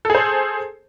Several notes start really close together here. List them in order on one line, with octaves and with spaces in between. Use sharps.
A4 G#4 C5